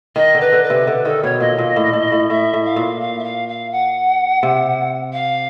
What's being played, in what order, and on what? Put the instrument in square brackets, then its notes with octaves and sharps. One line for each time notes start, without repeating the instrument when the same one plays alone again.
[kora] D#3 [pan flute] D#5
[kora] D3
[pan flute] B4
[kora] D3
[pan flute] B4
[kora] C3
D3
[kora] D#3 [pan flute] A4
[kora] B2 [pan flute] C#5
[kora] A#2 [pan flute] D#5
[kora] A#2
A2
A2
A2
[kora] A2 [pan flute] E5
[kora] A2
[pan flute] F5
[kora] A#2
[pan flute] F5
E5
F5
F5
F#5
[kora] C3
[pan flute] F5